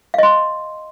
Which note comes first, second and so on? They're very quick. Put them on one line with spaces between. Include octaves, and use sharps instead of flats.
F5 D#5 C6